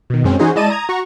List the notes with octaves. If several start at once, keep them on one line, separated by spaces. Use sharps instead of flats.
B2 D#3
F#2 G#3 C4 C#4
E3 C#4 D#4 F#4 G#4 C5
G#3 E4 D5 D#5 A5 D#7
A#5 D#6 G#6
F#4 A#5 C#6